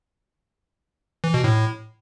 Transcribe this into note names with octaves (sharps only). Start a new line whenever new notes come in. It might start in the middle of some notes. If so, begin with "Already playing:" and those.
E3
B2
A2